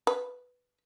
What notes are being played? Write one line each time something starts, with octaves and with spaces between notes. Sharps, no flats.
B4